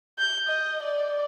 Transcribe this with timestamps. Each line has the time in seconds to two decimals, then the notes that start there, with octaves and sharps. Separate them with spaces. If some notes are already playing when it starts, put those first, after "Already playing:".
0.19 G6
0.48 D#5
0.82 D5